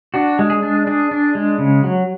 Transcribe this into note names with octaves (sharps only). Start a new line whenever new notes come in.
D4 F#4
G#3
G#4
D4
D4 G#4
D4
G#3
C#3
F#3